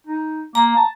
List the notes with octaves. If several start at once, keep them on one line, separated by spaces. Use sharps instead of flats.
D#4
A#3 A#5
A5